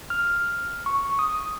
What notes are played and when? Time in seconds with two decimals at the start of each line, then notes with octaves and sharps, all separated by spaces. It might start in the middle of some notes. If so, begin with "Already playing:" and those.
0.10 F6
0.86 C#6
1.19 D#6